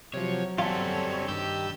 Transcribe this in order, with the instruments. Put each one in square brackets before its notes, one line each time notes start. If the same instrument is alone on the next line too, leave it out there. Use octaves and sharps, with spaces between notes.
[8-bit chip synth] C3 F3 [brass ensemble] F#3 [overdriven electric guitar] C#5
[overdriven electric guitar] G3 A4 [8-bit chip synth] C4 C#5 [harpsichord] F4
[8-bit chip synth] G2 E6 G6 [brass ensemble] D#3 [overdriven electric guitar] G4